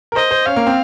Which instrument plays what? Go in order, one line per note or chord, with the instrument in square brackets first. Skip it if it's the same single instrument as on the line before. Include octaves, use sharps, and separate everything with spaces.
[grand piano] A#4
[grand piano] C5 [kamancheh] D#5
[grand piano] C5
[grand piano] C#4 [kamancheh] F5
[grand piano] A#3
C4